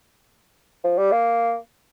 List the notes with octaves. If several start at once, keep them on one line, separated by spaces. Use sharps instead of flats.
F3
G3
A#3